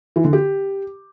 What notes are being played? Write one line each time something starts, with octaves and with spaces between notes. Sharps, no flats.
E3
D3
G4